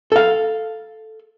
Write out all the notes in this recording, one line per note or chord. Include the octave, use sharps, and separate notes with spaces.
A4 F5